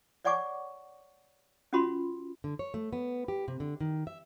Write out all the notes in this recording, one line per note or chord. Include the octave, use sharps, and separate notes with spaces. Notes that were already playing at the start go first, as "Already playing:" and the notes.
C#5 D5 F#5 G#5 C#6 D6
C#4 F4 F#4 B5 C6
D3
C#5
A3
B3
G4
C3
D3
D#3
E5